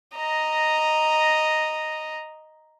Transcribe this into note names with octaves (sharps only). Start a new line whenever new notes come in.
D#5 A#5